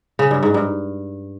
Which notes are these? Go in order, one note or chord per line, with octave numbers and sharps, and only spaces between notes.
C#3
G2
G#2
G2